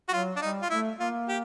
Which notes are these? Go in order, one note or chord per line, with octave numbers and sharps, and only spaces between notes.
F#4
F#3 F4
D4
G3 D#4
F4
A3 E4
A#3 F4
G4